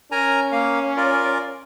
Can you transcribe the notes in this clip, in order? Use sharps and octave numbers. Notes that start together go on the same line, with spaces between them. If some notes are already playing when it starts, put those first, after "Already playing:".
C#4 A#4 G#5 A#5
A#3 F5
F4 A#4 D5